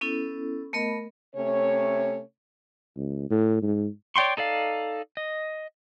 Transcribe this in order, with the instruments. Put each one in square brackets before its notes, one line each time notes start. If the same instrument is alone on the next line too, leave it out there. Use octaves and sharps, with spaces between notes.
[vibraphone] B3 C#4 E4 A4
A3 B3 A#4 D#5 B5
[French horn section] C3 A3 C#4 C#5
[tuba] C#2
A2
G#2
[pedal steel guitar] C#5 D5 G5 C6 C#6
D#4 A4 D5 F5
D#5